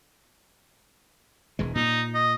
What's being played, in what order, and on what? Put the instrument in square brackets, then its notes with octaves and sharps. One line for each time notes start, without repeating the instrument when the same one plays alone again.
[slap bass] E1 E3 G#3
[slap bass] A#2 [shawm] D#4
[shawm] D#5